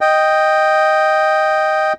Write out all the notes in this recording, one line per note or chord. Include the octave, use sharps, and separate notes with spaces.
D#5 G5